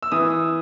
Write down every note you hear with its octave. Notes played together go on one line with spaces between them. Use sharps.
E6
E3 D#6